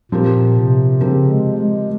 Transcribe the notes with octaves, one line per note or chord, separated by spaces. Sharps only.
A#2 F3 C4 G4 A#4
C3
C#3 F3 C4 G4 A#4
G#3
G#3